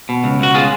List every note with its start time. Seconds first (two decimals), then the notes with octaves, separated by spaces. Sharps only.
0.09 B2
0.24 C#2
0.40 C#2 F#4
0.54 G#3 F4 G#4